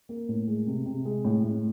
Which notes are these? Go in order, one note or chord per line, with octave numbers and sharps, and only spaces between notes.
A#3
A2
G#3
C3
C3
G#3
A2
A2